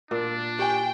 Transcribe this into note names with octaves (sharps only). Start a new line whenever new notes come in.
A#2 D4
G4 G5 G#5